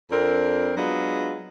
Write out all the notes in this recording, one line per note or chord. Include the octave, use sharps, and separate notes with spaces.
F2 C4 D4 A#4
F#3 G#3 B3 D4 F4